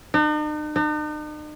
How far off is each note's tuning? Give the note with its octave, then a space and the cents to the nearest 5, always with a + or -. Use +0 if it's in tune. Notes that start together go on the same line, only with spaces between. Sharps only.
D#4 -45
D#4 -45